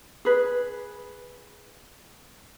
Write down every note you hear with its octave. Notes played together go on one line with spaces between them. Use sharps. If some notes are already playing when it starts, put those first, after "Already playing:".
G#4 B4